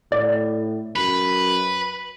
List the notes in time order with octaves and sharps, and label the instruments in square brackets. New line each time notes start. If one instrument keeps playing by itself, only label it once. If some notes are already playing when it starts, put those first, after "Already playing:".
[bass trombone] A2 [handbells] D5
[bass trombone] F#2 [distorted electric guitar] B4